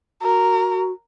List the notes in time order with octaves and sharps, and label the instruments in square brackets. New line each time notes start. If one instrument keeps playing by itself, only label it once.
[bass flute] F#4 [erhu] A#4